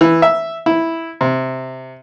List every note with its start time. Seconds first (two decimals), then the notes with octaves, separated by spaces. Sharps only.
0.01 E3
0.22 E5
0.66 E4
1.21 C3